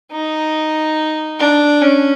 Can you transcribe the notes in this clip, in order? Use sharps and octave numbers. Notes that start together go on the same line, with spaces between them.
D#4
D4
C#4